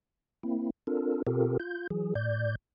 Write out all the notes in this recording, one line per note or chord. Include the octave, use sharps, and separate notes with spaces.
A#3 C4 E4
C4 D4 F4 A4 A#4
B2 C4 F4 G4 A4 A#4
F4 G6
E3 F#3 G#4
A2 D5 G6